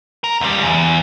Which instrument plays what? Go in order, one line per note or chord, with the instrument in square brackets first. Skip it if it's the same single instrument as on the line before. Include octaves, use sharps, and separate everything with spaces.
[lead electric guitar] A#4
C#2 G3
E2